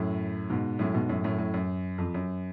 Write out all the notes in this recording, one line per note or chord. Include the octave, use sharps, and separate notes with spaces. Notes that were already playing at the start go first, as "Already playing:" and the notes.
Already playing: F#2 A2
G#2 B2
F#2 A2
G#2 B2
F#2 A2
F#2 A2
F#2 A2
F#2
F2
F#2